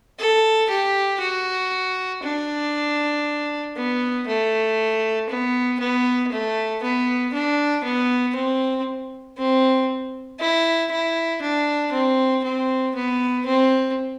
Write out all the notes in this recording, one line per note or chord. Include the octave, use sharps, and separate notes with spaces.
A4
G4
F#4
D4
B3
A3
B3
B3
A3
B3
D4
B3
C4
C4
E4
E4
D4
C4
C4
B3
C4